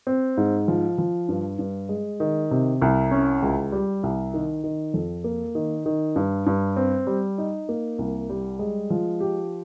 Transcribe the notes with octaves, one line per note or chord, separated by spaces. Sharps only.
C4
G#2
F3
F3
G2
G2
G#3
D#3
C3
C2
C#4
C#2
G3
C2
D#3
D#3
F2
A#3
D#3
D#3
G2
G2
C4
G3
D#4
A#3
C2
G3
G#3
F3
G4